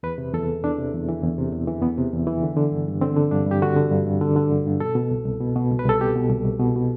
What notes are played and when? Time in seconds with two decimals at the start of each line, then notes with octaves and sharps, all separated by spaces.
0.03 E2 B4
0.18 C3
0.33 E2 A4
0.49 E3
0.63 E2 D4
0.79 C3
0.94 E2
1.08 E3
1.23 E2
1.38 C3
1.52 E2
1.67 E3
1.82 E2 B3
1.98 C3
2.13 E2
2.27 E3
2.43 D3
2.57 D3
2.72 G2
2.88 G2
3.01 D3 C4
3.16 D3
3.31 G2 D4
3.46 G2 G4
3.62 D3 F#4
3.76 D3
3.92 G2
4.06 G2
4.21 D3
4.36 D3
4.52 G2
4.66 G2
4.80 B2 A4
4.95 B2
5.11 C2
5.25 C2
5.40 B2
5.56 B2
5.71 C2
5.79 B4
5.85 C2 A4
6.00 B2 G4
6.16 B2
6.30 C2
6.45 C2
6.59 B2
6.75 B2